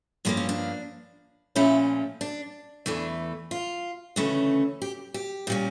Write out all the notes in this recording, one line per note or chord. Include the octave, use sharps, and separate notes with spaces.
G2 F3 A#3 C#4 D4
C#4
D4
A#2 F3 A3 C#4 E4
D4
E2 E3 A3 D4
F4
D2 C#3 E3 A3 C#4
G4
G4
A#2 G3 C#4